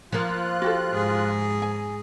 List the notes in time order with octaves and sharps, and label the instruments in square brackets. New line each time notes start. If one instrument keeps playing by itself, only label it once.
[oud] F3 A#3 [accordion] F4 F#6
[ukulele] F#4 G4 A4
[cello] G#2 G#4
[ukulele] G#5